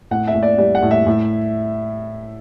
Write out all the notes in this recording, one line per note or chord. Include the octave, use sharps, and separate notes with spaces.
A2 F#5
E5
A2
D5
G3 D5
F#5
A2
E5
A2